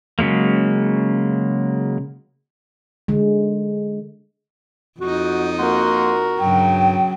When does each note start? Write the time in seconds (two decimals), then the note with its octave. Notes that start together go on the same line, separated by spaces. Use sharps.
0.19 C#3 F#3 G#3 A#3
3.08 D3 G#3
5.00 F2 D#4 F#4
5.59 A#3 F#4 A#4 F#5 C6
6.39 G2 C#3 F#3 G5